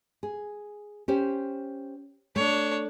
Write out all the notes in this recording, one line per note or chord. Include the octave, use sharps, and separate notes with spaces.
G#4
C#4 G4 C5
A3 D4 C#5